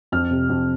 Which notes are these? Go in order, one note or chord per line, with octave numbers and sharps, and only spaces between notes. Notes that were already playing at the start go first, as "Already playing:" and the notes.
F2 F6
C3
F2